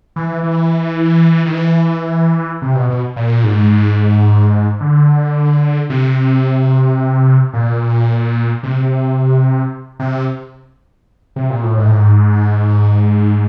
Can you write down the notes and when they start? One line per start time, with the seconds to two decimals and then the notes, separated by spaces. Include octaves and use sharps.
0.16 E3
0.43 E3
1.46 D#3
1.53 E3
2.62 C3
2.75 B2
2.90 B2
3.16 A#2
3.44 G#2
4.81 D3
5.90 C3
7.54 A#2
8.63 C3
10.00 C3
11.36 C3
11.50 A#2
11.64 A2
11.78 G#2
11.85 A2
11.92 G#2